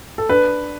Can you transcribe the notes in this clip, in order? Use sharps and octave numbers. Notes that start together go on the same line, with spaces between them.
A4
D4 B4